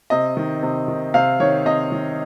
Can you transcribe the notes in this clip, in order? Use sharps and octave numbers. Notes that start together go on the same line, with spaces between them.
C3 D#5
D#3
C3
D#3
C3 F5
D#3 C#5
C3 D#5
D#3